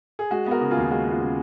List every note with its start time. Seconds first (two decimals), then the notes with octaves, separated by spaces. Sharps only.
0.19 G#4
0.31 G#3 F#4
0.46 B3 F#4 A#4
0.61 C#3
0.71 F4 G#4
0.77 D#2
0.83 F4
0.91 G#3 F#4
1.07 B3 F4
1.21 C#3